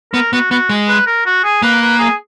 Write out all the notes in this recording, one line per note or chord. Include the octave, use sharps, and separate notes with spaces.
B3 A#4
B3 F#4
B3 F#4
G#3
B4
A#4
F#4
G#4
A#3 B4
B4
G#4